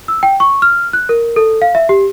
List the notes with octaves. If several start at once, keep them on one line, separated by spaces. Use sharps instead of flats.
E6
G5
C#6
F6
F#6
A#4
A4
F5
E5
G4